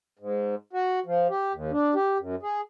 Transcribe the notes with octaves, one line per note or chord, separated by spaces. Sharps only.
G#2
F#4
F3
G4
D#2
D4
G4
F#2
G#4